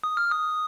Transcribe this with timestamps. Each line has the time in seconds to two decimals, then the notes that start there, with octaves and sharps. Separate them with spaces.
0.04 D#6
0.17 F6
0.31 D#6